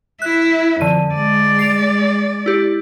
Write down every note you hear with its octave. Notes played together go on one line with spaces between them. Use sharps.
E4 F#6
F2 D3 D#7
G#3 D5
C7 D7 F7
E4 G4